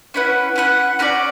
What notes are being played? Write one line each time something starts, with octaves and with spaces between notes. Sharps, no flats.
C#4 E4 B4 F#5
C#4 E4 B4 F#5
C#4 F#4 B4 D5